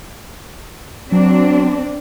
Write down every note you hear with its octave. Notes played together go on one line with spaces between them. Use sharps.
F#3 C4 D4